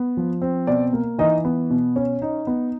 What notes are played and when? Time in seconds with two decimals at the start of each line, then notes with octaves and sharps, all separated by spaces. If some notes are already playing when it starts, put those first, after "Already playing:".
Already playing: B3
0.17 F3
0.42 C4
0.67 B2 D5
0.93 A#3
1.18 E3 D#4 D#5
1.45 B3
1.70 B2
1.96 C#4
2.22 D#4
2.47 B3